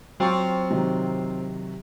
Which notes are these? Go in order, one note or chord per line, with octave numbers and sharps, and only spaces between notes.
F#3 C4 F4 C#6
C3 D#3 F#3